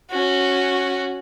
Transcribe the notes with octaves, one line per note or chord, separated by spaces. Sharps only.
C#4 F#4